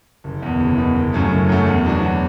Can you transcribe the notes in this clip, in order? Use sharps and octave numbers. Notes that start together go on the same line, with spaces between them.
F#1
E2 B2
F#1
E2 B2
F#1
F#2 F#3 A3
F#1
F#2 F#3 A3
E2
B2 F#3 D4 F#4
E2